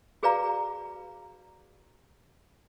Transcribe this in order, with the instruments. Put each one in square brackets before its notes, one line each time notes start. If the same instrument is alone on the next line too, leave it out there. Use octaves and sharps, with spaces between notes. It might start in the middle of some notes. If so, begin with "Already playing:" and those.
[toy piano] F#4 G#4 B4 D5 F5 A#5